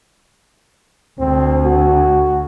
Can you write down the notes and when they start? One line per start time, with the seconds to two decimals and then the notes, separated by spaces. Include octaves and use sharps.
1.19 D2 C4
1.64 F#4